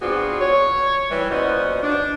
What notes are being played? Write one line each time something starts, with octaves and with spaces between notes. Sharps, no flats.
B3 C4 D4 F4 F#4 G#4
C#5
E3 G3
A#2 B3 C#4 F#4 C5 D#5
D4